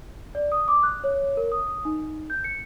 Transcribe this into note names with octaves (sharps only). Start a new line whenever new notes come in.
D5
D#6
D6
F#6
C#5
A#4
D#6
D#4
G6
C#7